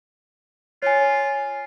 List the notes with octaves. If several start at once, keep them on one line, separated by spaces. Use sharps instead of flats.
F4 C#5 G#5